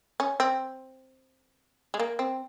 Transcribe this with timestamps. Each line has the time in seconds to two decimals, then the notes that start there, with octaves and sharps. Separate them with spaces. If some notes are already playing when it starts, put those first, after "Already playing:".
0.20 C#4
0.40 C4
1.94 G#3
2.00 A#3
2.19 C4